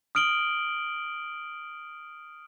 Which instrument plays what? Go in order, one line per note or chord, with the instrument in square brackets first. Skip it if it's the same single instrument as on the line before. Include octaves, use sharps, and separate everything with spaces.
[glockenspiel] D#6 F6 D7 F#7 G7